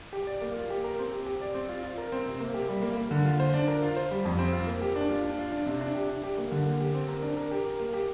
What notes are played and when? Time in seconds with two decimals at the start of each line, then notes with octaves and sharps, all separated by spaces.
0.13 G4
0.27 D5
0.41 A#3
0.56 F4
0.70 G4
0.84 A#4
0.99 C4
1.12 G4
1.26 G4
1.41 D5
1.54 C4
1.69 F4
1.83 F4
1.98 A#4
2.12 C4
2.26 C3
2.40 A#3
2.54 G4
2.69 G3
2.82 A#3
2.97 A#3
3.11 D3
3.25 F4
3.40 C5
3.54 D4
3.68 A#4
3.82 F4
3.96 C5
4.11 G3
4.25 F2
4.38 C4
4.53 F4
4.67 A#3
4.81 G4
4.96 D4
5.10 F4
5.24 D4
5.39 F4
5.52 D4
5.66 C3
5.81 D4
5.95 G4
6.09 D4
6.24 G4
6.38 A#3
6.52 D3
6.66 A#3
6.80 G4
6.94 C4
7.08 A#4
7.22 D4
7.37 A#4
7.51 G4
7.66 A#4
7.79 A#3
7.93 G4